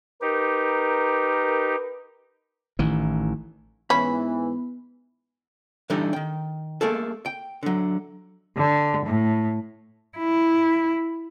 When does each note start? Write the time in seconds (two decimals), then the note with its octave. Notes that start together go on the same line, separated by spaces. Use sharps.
0.22 D#4 G4 A#4 B4
2.79 A1 D#3 E3
3.90 G#2 E3 B3 C#4 B5
5.90 D3 E3 G3 A3 D#4 G4
6.13 D#3 G5
6.81 A3 A#3 G#4 A4
7.26 G5
7.63 D3 F#3
8.57 D3
9.06 A2
10.18 E4